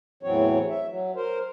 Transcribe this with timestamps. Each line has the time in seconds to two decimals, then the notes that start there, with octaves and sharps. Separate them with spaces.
0.23 E2 A2 E3 F#3 C4 C#5
0.69 E5
0.88 F#3
1.16 A#4 C5